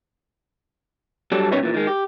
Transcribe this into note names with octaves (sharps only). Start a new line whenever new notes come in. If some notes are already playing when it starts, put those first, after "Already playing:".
F#3 G3 D4 A4
C2 B2 C#4 D#4 B4 C#5
A#2 E3
D#3 G#3
G4